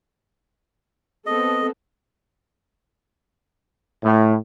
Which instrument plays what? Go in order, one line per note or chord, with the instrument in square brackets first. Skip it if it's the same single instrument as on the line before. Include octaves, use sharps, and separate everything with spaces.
[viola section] B3 C4 A4 [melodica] D#5
[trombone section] A2